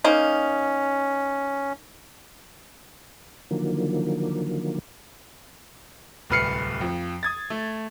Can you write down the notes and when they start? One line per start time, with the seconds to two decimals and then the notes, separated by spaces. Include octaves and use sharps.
0.04 A#3 C#4 D#4
3.51 D3 D#3 F3 F#3 A#3
6.30 D1 C2 B4 F6 C7 C#7
6.81 F2 F3
7.23 D#6 G#6 A6
7.50 A3